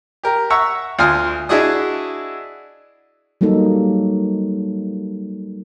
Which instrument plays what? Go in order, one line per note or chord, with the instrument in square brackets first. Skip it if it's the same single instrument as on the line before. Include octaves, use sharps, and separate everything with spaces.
[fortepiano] G4 A#4
E5 F#5 A#5 C#6 E6
D2 F4 F5 G#5 D#6 F6
D4 E4 F#4 G#4 D#5 D#6
[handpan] F#3 G3 A#3 D#4 A4